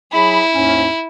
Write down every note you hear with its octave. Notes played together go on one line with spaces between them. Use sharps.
F#3 E4 G#4 B5
D#2 G#2 C#4